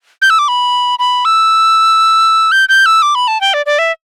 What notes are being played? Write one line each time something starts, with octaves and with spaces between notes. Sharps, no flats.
G6
E6
D6
B5
B5
E6
G6
G6
E6
D6
B5
A5
G5
D5
D5
E5